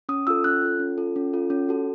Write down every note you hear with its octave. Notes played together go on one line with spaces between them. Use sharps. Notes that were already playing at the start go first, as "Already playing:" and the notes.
C#4 D#6
F4 A4 E6
C#4 F#6
F4 A4
C#4
F4 A4
C#4
F4 A4
C#4
F#4 A4